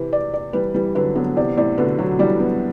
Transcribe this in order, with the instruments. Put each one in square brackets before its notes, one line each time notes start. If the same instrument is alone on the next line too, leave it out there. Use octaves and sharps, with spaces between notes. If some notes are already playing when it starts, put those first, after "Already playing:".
Already playing: [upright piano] C3 E3 [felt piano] B4
[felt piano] D5
D5
[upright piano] E3 G3 [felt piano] B4
[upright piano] E3 G3 [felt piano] B4
[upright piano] D3 F#3 [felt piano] B4
[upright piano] D3 F#3 [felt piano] B3
[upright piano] C3 E3 [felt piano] D5
[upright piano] A2 C3 [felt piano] D5
[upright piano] B2 D3 [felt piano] B4
[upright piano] D3 F#3 [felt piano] F#4
[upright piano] E3 G3 [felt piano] D5
[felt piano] B3